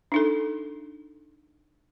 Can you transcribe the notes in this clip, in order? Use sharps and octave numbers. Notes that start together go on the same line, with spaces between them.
D4 D#4 A4